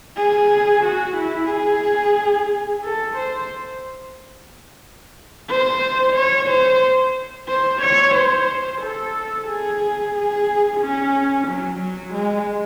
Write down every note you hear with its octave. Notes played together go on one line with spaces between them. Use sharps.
G#4
F#4
E4
G#4
A4
C5
C5
C#5
C5
C5
C#5
C5
A4
G#4
G#4
C#4
F#3
F#3
G#3